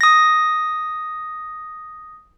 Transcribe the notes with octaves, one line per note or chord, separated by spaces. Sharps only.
D#6 A#6